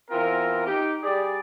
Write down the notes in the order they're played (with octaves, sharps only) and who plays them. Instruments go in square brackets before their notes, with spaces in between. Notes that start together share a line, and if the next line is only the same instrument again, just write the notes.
[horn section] E3 B3 C4 F4 A#4
D#4 G4
G3 G4 G#4 D5